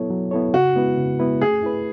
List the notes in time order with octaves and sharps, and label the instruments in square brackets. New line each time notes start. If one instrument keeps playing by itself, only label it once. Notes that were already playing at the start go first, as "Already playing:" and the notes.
Already playing: [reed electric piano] F#3 B3 E4 A4 C#5
F#3
B3 E4 A4 C#5
[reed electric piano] C#3 [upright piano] F#4
[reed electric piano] G#3 B3 E4 B4
C#3
G#3 B3 E4 B4
[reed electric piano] A3 [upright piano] G#4
[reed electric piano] E4 B4